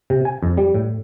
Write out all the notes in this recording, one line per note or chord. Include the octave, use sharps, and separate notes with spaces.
C3
G#5
F2
G3
A2